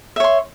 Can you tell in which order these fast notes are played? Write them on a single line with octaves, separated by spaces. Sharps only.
E5 C#5 C6